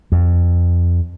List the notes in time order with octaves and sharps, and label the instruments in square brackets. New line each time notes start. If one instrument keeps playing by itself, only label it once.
[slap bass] F2